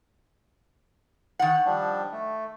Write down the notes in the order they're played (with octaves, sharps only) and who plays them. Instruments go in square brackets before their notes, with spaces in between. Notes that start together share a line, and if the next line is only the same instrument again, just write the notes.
[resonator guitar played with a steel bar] D#3 F#5
[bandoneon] F3 G3 D4
A3